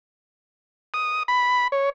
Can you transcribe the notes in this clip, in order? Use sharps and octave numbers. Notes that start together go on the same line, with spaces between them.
D#6
B5
C#5